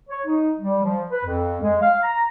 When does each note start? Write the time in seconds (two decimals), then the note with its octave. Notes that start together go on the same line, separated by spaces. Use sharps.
0.09 C#5
0.26 D#4
0.59 G3
0.83 F3
1.11 B4
1.25 F2
1.61 G#3
1.82 F5
2.03 A#5